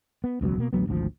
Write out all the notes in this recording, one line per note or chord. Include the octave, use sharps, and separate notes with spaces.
B3
E1 C#2 B2 F#3
B2 A#3
A1 D2 F#3 B3
G#1 D2 C#3 F3